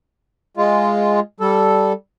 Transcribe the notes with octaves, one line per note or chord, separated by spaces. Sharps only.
G#3 F4
G3 A4